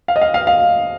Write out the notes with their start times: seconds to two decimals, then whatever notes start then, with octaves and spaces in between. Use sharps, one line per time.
0.08 F5
0.16 D#5
0.21 F5
0.34 F5
0.47 F5